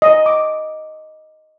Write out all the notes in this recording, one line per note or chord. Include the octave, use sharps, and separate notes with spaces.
D#5
D6